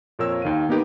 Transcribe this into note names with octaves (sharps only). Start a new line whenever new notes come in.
F2 A#2 A#3 A#4 C#5 E6
D#2 D#3 F5 D#7
A#3 B3 D#4 G4 A#4 B4